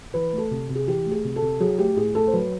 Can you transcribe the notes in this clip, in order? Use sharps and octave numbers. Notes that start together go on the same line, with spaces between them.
E3 B4
A3
A4
C3
C3
G#4
E3 G4
A3
G#4
C3
A4
C3
F#3 G#4
A3 G4
A2 G#4
A2 A4
C5
F#3 B4